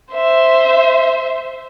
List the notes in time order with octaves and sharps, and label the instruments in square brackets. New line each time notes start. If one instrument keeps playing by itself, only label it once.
[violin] C5 E5